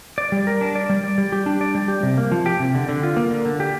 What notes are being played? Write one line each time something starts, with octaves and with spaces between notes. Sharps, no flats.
D5
G3
A#4
D4
D5
G3
D5
G3
G4
D4
D5
G3
G4
C3
A#3
F3
G4
C3
D3
D3
F4
A#3
D3
D3
G4